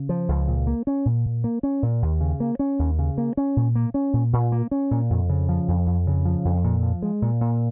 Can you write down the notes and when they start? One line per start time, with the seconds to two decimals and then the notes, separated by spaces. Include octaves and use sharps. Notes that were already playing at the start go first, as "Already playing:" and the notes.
Already playing: C#3
0.09 F3
0.28 C#2
0.48 A#2
0.67 A#3
0.87 C#4
1.05 A#2
1.26 A#2
1.44 A#3
1.63 C#4
1.83 A#2
2.02 D#2
2.21 C#3
2.40 A#3
2.59 C#4
2.79 D#2
2.99 C#3
3.18 A#3
3.37 C#4
3.56 A#2
3.75 A#3
3.94 C#4
4.13 A#2
4.33 A#2
4.52 A#3
4.71 C#4
4.91 A#2
5.10 F2
5.29 C#3
5.49 F3
5.68 F2
5.87 F2
6.07 C#3
6.25 F3
6.45 F2
6.64 A#2
6.83 F3
7.02 G#3
7.22 A#2
7.41 A#2